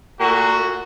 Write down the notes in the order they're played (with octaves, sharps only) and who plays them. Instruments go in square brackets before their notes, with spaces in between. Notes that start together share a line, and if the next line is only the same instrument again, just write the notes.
[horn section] A#2 A3 F#4